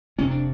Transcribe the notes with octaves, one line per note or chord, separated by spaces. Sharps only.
F1 F2 C3 C#4
D4